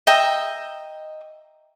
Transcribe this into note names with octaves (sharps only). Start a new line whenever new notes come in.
D#5 E5 G5 A#5